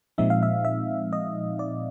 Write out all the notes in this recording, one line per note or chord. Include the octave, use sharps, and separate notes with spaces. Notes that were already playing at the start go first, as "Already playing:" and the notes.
A#2 F3 G#3 C4 D#4 E5
F5
E5
E5
D#5
D5